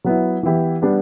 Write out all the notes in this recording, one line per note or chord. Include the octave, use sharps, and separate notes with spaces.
F#3 B3 E4
E3 B3 E4 G4
G3 B3 D4